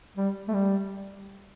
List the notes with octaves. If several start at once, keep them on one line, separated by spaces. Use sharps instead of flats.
G3
A3
G3